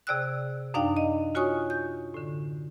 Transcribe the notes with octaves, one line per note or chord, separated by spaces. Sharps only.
C3 G#4 D5 G5 E6 F#6
F#2 D4 D#4 D5 F5 G5
D#5
F4 F#4 C#5 G#5 C#6 D#6
G6
A2 D3